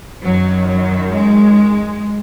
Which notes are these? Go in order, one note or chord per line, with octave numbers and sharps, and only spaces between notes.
F#2 D#3 F#3
F#3
G#3